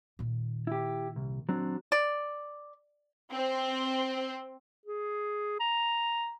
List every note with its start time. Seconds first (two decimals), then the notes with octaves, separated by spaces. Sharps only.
0.19 A#2 D#3
0.67 E4 G4
1.16 C2
1.49 F#3 C4 D4
1.92 D5
3.32 C4
4.86 G#4
5.60 A#5